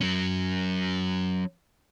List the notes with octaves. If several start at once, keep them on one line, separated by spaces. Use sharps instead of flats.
F#3 C#4